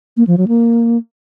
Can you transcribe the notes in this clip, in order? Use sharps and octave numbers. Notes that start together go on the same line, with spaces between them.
A#3
F3
F#3
A#3